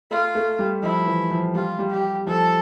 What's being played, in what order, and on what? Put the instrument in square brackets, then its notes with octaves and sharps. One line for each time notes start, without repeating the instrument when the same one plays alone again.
[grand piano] A3 [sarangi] F4
[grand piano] A3
G3
[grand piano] F3 [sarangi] E4
[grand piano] E3
F3
[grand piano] G3 [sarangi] F4
[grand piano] G3
[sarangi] G4
[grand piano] F3 [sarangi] A4